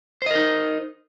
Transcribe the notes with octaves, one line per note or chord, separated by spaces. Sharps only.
D#4 A#4 C5 D#5